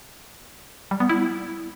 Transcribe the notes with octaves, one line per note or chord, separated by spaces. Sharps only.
G3
B3
E4